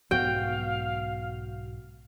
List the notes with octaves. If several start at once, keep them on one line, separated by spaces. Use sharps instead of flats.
B1 G#2 B3 F#4 F5 G5